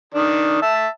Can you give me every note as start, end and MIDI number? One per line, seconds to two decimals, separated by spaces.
0.14 0.62 51
0.14 0.62 62
0.62 0.88 76
0.62 0.88 81